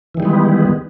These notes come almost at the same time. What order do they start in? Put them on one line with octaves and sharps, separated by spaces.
E3 D#3 G3 G#3 B3